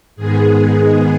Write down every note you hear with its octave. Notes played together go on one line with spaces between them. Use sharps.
G#2 D#3 G#3 B3 G#4